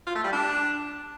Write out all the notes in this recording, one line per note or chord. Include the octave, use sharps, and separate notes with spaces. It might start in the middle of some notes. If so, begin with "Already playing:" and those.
F4
A3
G3
D4